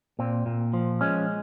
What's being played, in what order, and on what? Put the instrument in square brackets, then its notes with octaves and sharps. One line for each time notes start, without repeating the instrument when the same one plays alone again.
[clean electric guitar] A#2 C4
A#2
F3
G#3 C#4